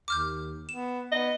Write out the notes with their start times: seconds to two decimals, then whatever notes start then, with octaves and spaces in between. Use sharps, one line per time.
0.08 D#2 D6 F6 G6
0.69 B3 E7
1.12 B3 D#5